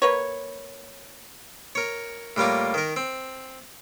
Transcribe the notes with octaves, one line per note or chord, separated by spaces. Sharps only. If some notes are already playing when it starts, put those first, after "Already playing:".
A#3 B4 C#5
A#4 C#5
A2 G3 A#3 F4
D#3 A#4
C4